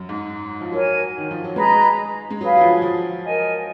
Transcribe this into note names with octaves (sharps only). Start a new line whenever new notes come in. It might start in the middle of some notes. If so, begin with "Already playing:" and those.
Already playing: F#2
G#2
F3
F#3 A#4 C#5 G#5
D#3
F3
F#3
G#3 G#4 B4 D#5 A#5
G#3
F#3 G#4 B4 F5
F#3
F3
F3
A#4 D#5 G#5